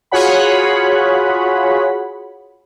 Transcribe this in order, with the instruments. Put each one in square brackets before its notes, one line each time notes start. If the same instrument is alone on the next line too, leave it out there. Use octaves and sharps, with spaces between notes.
[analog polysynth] F4 F#4 G#4 C#5 F#5 B5